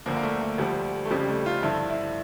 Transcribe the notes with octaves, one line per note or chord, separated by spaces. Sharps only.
D2 D3 F3 A#3
A#3
A3
A3
D2 D3 F3 G3
A3
F2 C#3 F3 G3
A3
F4
G2 D3 F3 E4
E4